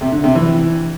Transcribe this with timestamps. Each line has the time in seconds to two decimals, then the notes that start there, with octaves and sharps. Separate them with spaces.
0.01 C3
0.12 D3
0.24 C3
0.35 E3